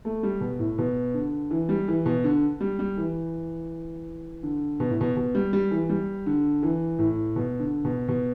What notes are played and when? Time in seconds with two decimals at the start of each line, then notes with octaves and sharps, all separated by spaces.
0.05 A3
0.23 G3
0.41 B2
0.59 A2
0.78 B2
1.14 D3
1.51 E3
1.69 G3
1.88 E3
2.06 B2
2.24 D3
2.61 G3
2.79 G3
2.97 E3
4.43 D3
4.80 B2
4.90 A2
5.01 B2
5.16 B2
5.35 G3
5.53 G3
5.71 E3
5.90 G3
6.26 D3
6.63 E3
6.99 A2
7.36 B2
7.59 D3
7.85 B2
8.08 B2